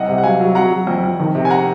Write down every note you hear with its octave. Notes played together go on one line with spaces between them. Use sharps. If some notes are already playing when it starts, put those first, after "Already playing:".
Already playing: C2 D#5 F#5
C3
F#5
F#3 F5 G#5
F#3
F#3 F#5 A#5
F#3
F2
F2
D#3
C3
G#5
F#5 A#5